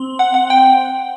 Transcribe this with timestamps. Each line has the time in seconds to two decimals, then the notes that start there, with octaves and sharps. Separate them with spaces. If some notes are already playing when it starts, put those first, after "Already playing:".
Already playing: C4
0.19 F#5
0.34 F#5
0.50 G5